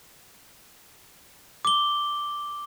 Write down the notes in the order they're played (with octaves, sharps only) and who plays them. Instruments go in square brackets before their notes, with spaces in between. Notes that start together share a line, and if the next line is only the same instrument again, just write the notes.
[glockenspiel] D6 G7